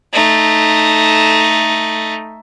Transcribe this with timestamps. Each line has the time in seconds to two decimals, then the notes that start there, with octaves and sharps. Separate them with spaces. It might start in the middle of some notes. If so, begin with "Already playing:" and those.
0.13 A3 D#4